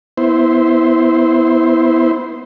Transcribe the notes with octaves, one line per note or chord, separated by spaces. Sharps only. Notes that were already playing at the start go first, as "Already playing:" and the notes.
B3 E4 C5